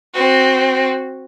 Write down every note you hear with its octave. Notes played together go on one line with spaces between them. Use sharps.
C4 F#4